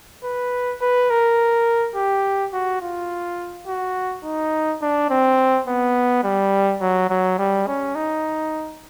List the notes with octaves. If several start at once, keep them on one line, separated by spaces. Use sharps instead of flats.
B4
B4
A#4
G4
F#4
F4
F#4
D#4
D4
C4
B3
G3
F#3
F#3
G3
C#4
D#4